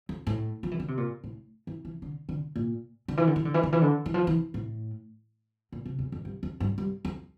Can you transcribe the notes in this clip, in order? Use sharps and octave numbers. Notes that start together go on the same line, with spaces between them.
F2
A2
F3
E3
D3
C3
A#2
A2
E3
E3
D3
D3
A#2
D3
E3
D3
E3
D3
E3
D3
E3
D3
E3
F3
E3
A2
A#2
C3
E2
F2
G2
F2
G2
G2
F2